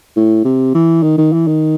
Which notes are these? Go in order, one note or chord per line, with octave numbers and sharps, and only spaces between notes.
A2
C3
E3
D#3
D#3
E3
D#3